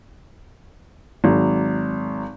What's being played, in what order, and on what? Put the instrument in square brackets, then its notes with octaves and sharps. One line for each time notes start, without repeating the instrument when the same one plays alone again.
[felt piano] G#1 F#3